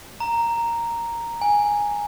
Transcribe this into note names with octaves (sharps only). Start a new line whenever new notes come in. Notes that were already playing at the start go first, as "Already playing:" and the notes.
A#5
G#5